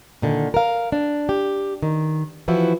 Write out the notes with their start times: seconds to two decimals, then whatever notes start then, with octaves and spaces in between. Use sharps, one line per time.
0.22 A#2 D3 D#3
0.54 A#4 F5
0.92 D4
1.29 G4
1.82 D#3
2.48 E3 F3 E4 F#4